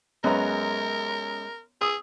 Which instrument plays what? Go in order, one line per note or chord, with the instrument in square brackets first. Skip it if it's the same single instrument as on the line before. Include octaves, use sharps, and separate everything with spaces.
[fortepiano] F#2 B3 C#4 [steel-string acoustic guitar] G#3 A#5 [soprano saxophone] A#4
[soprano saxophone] G#4 [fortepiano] D#6 E6